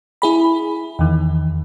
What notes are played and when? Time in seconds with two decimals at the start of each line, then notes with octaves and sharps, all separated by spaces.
0.22 E4 G#4 B5
0.99 E2 D#3